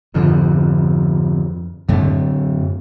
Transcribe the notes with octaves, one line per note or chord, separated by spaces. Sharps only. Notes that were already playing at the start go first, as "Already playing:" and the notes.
F2 G#2 D3 F3
F#2 A2 D3 A3